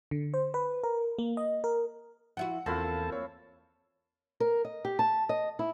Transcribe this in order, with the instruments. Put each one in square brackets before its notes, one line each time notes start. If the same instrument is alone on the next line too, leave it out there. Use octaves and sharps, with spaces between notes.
[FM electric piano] D3
C5
B4
A#4
A#3
D#5
A#4
[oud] F3 E4 F#4 [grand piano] F#5
[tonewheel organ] E2 A4 A5 [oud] A#3 [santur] C4 E4 F4
[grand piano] C#5
[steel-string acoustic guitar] A#4
D#5
G4
A5
D#5
E4